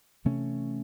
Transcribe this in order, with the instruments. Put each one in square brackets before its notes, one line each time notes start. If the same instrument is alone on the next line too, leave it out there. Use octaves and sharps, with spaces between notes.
[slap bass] C3 E3 A3 C#4